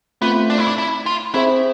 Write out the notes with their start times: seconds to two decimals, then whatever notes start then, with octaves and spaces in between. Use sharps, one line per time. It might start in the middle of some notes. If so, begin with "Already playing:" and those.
0.21 A3 B3 C4 F4
0.50 D4
0.58 E4
0.68 D4
0.78 E4
1.06 F4
1.34 C4 E4 G#4 C5 E5